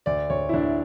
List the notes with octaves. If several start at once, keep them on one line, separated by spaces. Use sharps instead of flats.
D2 D5
D2 C#5
E4
D2 D4